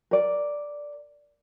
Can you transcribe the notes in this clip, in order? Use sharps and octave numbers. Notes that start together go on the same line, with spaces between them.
A#4 D5